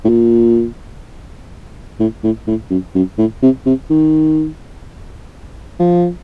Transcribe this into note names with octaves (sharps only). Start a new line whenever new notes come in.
A2
A#2
A2
A2
A2
F#2
F#2
A2
C3
C3
D#3
F3